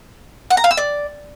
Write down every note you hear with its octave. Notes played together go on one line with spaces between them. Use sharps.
F#5
A#5
F5
E6
D5